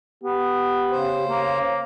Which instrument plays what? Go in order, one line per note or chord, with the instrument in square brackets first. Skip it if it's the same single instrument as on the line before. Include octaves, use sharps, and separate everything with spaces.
[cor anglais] B3 [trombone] G4
[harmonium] C#3 C5
[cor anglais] A#3 [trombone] C#5